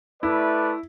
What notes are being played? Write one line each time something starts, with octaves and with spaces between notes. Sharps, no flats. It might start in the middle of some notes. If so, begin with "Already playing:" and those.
A3 E4 B4 D5